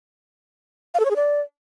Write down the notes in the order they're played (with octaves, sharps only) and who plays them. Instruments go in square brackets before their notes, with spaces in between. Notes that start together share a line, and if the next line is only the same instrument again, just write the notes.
[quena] F5
A4
C#5
G#4
D5